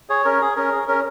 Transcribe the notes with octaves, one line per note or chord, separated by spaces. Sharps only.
G#4 C#5
C#4 A#4
G#4
C#4 A#4
G#4
C#4 A#4